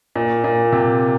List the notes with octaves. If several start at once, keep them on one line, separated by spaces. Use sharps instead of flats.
A#2
A#2
C3